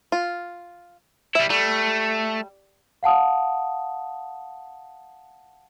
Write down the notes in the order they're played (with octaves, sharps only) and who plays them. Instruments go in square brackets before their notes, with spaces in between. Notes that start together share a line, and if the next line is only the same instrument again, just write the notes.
[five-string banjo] F4
[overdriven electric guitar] G3 E4 [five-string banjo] E5
[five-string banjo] G3 [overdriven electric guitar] A3
[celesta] F5 F#5 A5 D#6